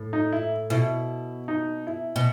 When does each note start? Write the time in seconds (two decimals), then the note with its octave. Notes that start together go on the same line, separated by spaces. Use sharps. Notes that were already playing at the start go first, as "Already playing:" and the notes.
Already playing: A2
0.13 D#4
0.32 E4
0.70 B2 E4
1.48 D#4
1.87 E4
2.16 B2